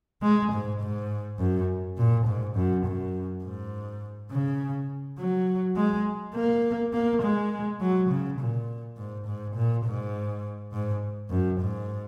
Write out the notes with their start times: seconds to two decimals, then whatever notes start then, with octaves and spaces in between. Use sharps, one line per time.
0.22 G#3
0.52 G#2
0.81 G#2
1.40 F#2
1.97 A#2
2.26 G#2
2.56 F#2
2.85 F#2
3.44 G#2
4.31 C#3
5.18 F#3
5.77 G#3
6.35 A#3
6.93 A#3
7.22 G#3
7.81 F#3
8.10 C#3
8.39 A#2
8.97 G#2
9.27 G#2
9.56 A#2
9.85 G#2
10.73 G#2
11.30 F#2
11.60 G#2